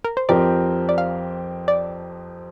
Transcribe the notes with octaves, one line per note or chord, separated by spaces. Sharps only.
A#4
C5
F2 F3 C4 G4 A#4 D5
D5
F5
D5